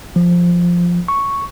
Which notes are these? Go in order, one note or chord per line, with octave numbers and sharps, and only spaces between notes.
F3
C#6